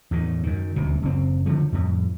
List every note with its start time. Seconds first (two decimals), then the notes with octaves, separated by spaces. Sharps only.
0.11 E2 A2 D#3
0.43 F#2 D#3
0.76 D#1 D2 C3
1.02 F#1 C4
1.46 D3 F3 A3
1.72 F2 A2